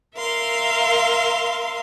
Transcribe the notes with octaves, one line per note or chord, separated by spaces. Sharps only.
A#4 E5 F5 C6